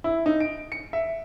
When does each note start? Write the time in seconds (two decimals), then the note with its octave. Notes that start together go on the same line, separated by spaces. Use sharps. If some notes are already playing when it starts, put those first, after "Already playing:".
0.04 E4
0.26 D#4
0.40 D7
0.72 C#7
0.93 E5